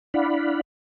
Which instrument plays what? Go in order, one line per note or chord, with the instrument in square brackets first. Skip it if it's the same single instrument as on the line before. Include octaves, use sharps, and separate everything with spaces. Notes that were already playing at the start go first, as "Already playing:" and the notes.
[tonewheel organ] D4 E4 D5 F5 F#5 B5